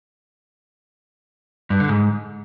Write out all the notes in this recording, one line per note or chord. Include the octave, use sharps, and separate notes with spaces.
G2
D3
G#2